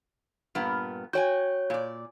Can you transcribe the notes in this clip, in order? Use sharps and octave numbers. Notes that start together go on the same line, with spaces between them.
G2 A#2 B3
F#4 C#5 G5 G#5 G6
A#2 D5